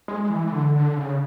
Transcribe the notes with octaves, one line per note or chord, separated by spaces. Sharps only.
G#3
E3
D3
D3
C#3